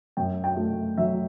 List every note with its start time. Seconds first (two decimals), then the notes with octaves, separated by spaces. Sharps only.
0.17 F#2 G5
0.44 G5
0.57 A3
0.98 F#3 E5